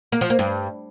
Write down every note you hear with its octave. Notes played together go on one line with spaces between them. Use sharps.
A#3
F3
A#3
G2